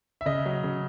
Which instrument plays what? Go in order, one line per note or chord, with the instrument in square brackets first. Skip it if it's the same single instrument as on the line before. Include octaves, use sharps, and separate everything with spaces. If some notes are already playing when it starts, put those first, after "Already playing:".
[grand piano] E5
C#3 D#5
F#3
C#3